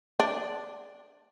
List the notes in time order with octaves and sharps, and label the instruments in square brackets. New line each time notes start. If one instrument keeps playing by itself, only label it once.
[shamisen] D4